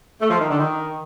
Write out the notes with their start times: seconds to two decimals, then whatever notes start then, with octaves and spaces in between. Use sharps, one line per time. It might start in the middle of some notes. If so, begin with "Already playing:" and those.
0.21 A3
0.30 F3
0.40 D#3
0.50 D3
0.60 D#3